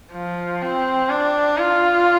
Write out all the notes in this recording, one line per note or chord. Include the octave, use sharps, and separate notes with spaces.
F3
C4
D4
F4